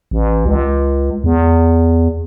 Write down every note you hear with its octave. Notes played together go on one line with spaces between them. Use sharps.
A1
C#2
E2